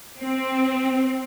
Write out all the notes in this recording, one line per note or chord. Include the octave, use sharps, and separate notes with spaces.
C4